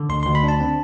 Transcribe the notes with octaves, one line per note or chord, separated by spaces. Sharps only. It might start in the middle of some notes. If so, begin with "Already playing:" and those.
Already playing: D3
D2 C6
D2 C6
B5
D4 A5
C4